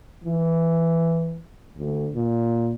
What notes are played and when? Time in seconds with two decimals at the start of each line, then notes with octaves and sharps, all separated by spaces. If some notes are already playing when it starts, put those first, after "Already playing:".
0.24 E3
1.77 D2
2.15 A#2